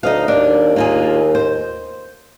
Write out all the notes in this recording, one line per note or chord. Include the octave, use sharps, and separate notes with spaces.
D2 D#4 D#5 F5
D#2 D4
A#3 F4 G#4
C5